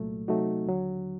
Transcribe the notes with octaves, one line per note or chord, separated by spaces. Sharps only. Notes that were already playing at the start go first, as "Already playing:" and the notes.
Already playing: C2 A#2 F#3 A3
C3 F#3 A3 D#4 F#4
D#2 D3 F#3